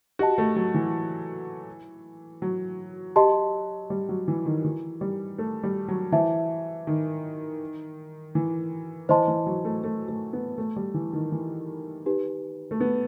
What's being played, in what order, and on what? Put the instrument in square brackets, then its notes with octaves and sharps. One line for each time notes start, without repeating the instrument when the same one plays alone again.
[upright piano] F#4 [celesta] G4 D#5 A5
[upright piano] A3
F#3
E3
F#3
[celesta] G4 D#5 A5 C6
[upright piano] G3
F#3
E3
D#3
E3
G3
A3
G3
F#3
[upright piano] E3 [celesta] C5 E5 A5
[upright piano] D#3
E3
[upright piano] E3 [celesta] C5 D#5 A5 C6
[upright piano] E3
F#3
A3
A3
A3
B3
A3
G3
E3
D#3
E3
[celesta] D#4 G4 B4
[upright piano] A3
B3